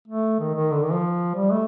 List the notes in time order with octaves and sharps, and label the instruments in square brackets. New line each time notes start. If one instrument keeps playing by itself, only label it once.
[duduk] A3
D#3
D#3
D3
D#3
F3
G3
A3